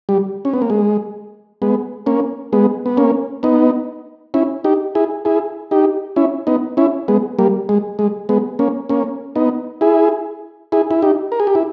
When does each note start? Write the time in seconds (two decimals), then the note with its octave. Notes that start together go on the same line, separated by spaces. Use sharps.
0.09 G3
0.45 C#4
0.53 B3
0.62 A#3
0.70 G#3
1.62 G#3 B3
2.06 A#3 C#4
2.53 G#3 B3
2.86 B3
2.97 A#3 C#4
3.43 B3 D#4
4.34 C#4 E4
4.64 D#4 G4
4.95 E4 G#4
5.25 E4 G#4
5.71 D#4 G4
6.16 C#4 E4
6.47 B3 D#4
6.77 C#4 E4
7.08 G#3 B3
7.39 G3 A#3
7.69 G#3
7.99 G#3
8.29 G#3 B3
8.59 A#3 C#4
8.89 A#3 C#4
9.36 B3 D#4
9.81 E4 G#4
10.72 E4 G#4
10.91 E4
11.02 D#4 G4
11.32 A#4
11.40 G#4
11.47 G4
11.55 E4